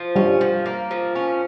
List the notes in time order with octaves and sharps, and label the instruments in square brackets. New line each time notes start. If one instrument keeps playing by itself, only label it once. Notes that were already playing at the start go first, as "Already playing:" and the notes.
Already playing: [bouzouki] F3
[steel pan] G3 [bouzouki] C#4
[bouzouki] F3
A#3
F3
C#4